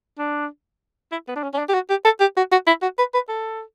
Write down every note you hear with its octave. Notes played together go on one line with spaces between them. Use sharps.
D4
E4
B3
D4
C#4
C#4
D4
G4
F#4
G4
A4
G4
F#4
F#4
E4
F#4
B4
B4
A4